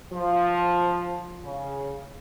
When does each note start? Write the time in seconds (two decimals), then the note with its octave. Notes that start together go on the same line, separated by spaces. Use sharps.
0.13 F3
1.44 C#3